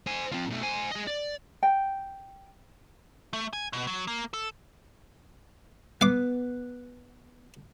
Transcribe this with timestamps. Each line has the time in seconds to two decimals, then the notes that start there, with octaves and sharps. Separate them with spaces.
0.07 C5 G#5
0.32 C4 F4
0.50 B1 A3
0.62 C5 G#5
0.91 G#4 D#5
1.07 D5
1.63 G5
3.33 A3
3.53 G#5
3.73 B2
3.87 F#3
4.08 A#3
4.33 A4
6.01 B3 F5 D6